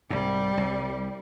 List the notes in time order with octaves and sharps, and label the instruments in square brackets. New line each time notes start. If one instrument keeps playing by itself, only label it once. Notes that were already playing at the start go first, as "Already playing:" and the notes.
[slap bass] C2 G#2 [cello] G3
[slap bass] C2